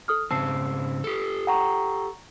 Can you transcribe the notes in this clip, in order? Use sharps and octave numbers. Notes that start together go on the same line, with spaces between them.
A4 D#6 F6
G#2 C#3 C4 A5 E6 C7
G4 A4
F#5 G5 A#5 C#6